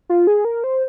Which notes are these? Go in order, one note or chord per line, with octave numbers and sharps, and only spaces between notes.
F4
G#4
A#4
C5